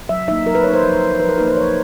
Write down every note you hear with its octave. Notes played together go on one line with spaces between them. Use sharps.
F#3 E5
A#3 D#4 E5
F#3 A#4
B4
A#3 D#4 C#5
C5
F3
A#3 D#4
F3 B4
A#4
A#3 D#4 B4
C5
F3 C#5